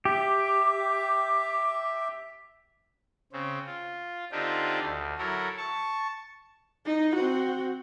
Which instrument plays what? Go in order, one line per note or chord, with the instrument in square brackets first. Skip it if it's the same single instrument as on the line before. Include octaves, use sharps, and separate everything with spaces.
[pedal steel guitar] G4 [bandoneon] E5 [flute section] D6
[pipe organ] C#3 C4
F4
D3 C4 D4 D#4 F4 G4
D2
F#3 E4 A4 A#4
A5 C#6
[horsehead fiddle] D#4
C4 F#4